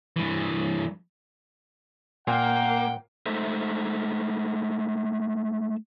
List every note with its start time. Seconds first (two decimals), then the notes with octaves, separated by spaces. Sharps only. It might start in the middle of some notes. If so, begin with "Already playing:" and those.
0.16 G2 E3
2.28 A#2 A#3 F#5 G5
3.26 G#3 A3 D#4 A4 C5 E5